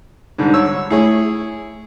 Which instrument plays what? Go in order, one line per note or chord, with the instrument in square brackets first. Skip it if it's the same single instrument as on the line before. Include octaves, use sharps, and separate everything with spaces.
[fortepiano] G#2 D3 G3
C#5 E6
[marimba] A3 [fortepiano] E4 G#4 C#5